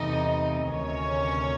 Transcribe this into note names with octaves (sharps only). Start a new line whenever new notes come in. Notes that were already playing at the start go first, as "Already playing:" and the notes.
Already playing: E2 C3 E3 A3 D#4 D#5
D2 C3 D#3 C#4 C#5